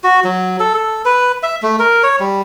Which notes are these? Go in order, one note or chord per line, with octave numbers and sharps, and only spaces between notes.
F#4
F#3
A4
A4
B4
E5
A3
A#4
C#5
G3